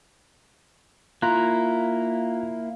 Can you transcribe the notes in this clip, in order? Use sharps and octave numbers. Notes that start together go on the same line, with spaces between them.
A#3 E4 F4 A#5 F#6